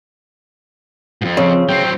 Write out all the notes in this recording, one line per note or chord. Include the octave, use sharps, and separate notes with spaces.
F2 G#2
C#3 F3 C4
F#3 C4 G5